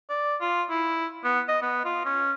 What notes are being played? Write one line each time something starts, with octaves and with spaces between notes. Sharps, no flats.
D5
F4
E4
B3
D#5
B3
F4
C#4